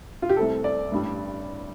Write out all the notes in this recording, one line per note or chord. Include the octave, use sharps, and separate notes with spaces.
F4
G4
C2 C3 A3 A4
D5
A1 G2 G3